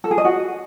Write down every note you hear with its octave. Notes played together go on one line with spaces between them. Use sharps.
A4
G#4
D#5
F#4